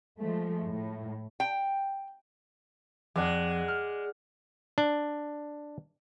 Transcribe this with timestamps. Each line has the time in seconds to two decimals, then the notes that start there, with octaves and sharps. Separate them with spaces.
0.21 F3 G#3 A3
0.69 A2
1.40 G5
3.16 F2 G#3 D5 F#5
3.68 F6
4.78 D4